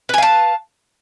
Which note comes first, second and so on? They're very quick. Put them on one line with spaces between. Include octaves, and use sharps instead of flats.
B4 G#5 F5 A5